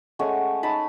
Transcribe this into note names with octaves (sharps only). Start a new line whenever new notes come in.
G#3 A3 C#4 F#5
D#4 E5 A5 B5